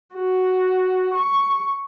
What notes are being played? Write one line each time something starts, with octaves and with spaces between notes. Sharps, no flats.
F#4
C#6